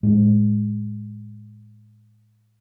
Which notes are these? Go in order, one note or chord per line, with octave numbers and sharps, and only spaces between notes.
A2 G#3